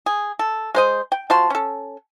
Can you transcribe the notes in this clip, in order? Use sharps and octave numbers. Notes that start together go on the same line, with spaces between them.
G#4
A4
G#3 C5 D#5
G5
F3 F#4 A5 C6
C#4 A4